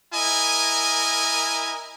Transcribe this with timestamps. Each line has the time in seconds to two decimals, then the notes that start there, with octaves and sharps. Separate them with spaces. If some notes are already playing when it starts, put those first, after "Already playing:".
0.14 E4 A#4 D#5 G#5